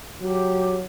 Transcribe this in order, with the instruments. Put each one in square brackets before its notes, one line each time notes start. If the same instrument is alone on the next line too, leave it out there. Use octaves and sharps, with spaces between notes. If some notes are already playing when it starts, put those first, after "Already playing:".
[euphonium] F#3 [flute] G4